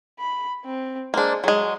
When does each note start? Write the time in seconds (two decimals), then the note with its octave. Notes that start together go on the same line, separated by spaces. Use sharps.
0.19 B5
0.65 C4
1.14 G#3 A#3 D4 C5
1.44 F#3 G#3 G#4